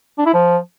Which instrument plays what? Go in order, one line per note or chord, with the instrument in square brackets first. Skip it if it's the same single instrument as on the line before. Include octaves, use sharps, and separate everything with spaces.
[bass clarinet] D4
E4
F3